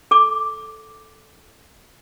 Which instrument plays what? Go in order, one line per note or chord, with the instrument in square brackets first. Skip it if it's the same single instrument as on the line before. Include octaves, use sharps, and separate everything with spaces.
[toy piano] A4 D6